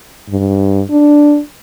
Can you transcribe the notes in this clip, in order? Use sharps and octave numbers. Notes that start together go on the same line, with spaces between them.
G2
D4